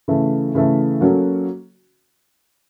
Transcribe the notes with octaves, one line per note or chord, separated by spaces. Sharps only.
C#3 E3 A3
C#3 E3 A3
F#3 A#3 C#4 F#4 A4